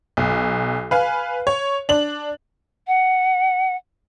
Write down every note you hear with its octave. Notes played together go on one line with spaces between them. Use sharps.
B1
B4 F5 G#5
C#5
D4 F#7
F#5